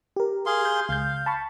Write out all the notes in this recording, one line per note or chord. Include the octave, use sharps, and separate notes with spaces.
G4 A#4
G#4 F5 C6
G6
C#2 F5 G6
A5 B5 C#6